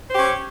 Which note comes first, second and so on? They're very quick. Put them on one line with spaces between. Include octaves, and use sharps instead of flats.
C5 G4 C#4